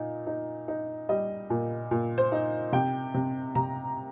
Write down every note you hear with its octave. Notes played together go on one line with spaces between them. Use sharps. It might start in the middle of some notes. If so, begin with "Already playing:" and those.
Already playing: A#2 D#4
D#4
D#4
G3 D#5
A#2
A#2
C5
D#4
C3 G5
C3
C3 A#5